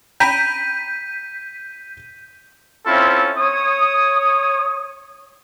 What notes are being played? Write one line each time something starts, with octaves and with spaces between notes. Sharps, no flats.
G5 A#5 B5 G6 B6 D#7
C4 C#4 E4 F4 A4
C#5 D#6